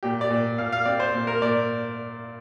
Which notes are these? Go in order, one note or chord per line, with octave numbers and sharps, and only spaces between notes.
A#2 G4
D5
A#2
A#2 F5
F5
C4 D5
C5
A#2
A#4
A#2 D5